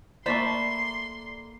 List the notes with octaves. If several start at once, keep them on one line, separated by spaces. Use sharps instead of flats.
A3 A#3 C5 D5 A5 B5 C6